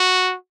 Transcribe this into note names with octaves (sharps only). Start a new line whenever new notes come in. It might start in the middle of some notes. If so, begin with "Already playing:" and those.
Already playing: F#4